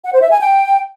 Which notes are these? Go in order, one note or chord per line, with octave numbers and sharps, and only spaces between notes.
F#5
C5
E5
G#5
G5